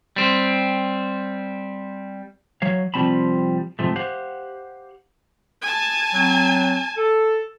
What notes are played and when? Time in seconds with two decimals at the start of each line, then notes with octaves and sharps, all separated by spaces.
0.16 G3 C4
2.62 F#3 C#5 F5
2.94 C3 F3 G3 C4 A5 B5
3.79 G#2 C3 F3 A3
3.96 G4 C5 F5 F#5
5.62 G#5 A5
6.14 F#3 C4
6.97 A4